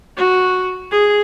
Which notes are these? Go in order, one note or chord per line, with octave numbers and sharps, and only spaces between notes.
F#4
G#4